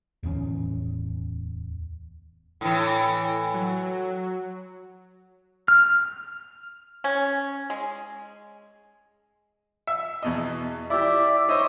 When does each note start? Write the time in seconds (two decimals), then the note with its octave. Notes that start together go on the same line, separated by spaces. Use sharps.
0.23 D1 E2 B3 C#4
2.61 A2 E3
3.54 F#3
5.68 F6
7.04 C#4
7.70 G#3
9.87 E5
10.23 E2 B2 D#5
10.90 E4 G4 D5 E5
11.49 D#4 C5 C#5 E5 C#6 D#6